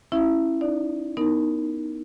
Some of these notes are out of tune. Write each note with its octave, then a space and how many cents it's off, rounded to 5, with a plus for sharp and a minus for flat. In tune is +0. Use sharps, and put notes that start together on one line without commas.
C#4 -25 E4 +0 E5 +25
D#4 -30 D5 +0
B3 +0 D#4 +0 A#4 +0